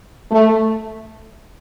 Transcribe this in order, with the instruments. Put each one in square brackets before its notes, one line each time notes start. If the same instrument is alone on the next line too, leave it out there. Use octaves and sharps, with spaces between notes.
[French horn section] A3